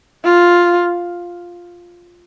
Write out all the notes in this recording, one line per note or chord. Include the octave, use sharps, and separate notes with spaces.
F4